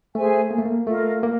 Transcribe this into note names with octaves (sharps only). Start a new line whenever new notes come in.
A3 G#4 C5 E5 G#5
A#3
A3
A#3
A3 F4 A#4 D#5
A#3